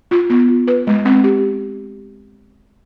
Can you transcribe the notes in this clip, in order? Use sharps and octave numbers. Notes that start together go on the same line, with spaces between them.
F4
B3
F4
B4
G#3
C4
G4